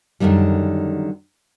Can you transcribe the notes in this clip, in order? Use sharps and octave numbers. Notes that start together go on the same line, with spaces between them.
F#2 A2 D3 D#3 G3